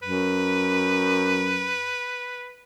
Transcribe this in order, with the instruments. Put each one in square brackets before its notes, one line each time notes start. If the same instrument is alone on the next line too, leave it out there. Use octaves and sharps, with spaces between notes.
[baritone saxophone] F#2 [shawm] B4